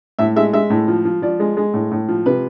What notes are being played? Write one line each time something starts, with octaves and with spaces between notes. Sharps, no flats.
A2 E5
G#3 E5
G#3 E5
A2
F3
F3
F3 D5
G#3
G#3
A2
A2
F3
C3 B4